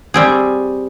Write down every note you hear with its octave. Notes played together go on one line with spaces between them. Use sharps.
G3 C4 G#4